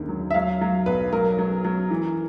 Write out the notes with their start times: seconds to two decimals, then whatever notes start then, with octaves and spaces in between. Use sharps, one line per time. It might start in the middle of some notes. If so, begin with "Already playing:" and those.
Already playing: F#1 D#2 D3
0.08 F#3
0.31 E5
0.34 F#3 F5
0.61 F#3
0.86 B1 B4
1.13 F#3 A#4
1.39 F#3
1.65 F#3
1.91 E3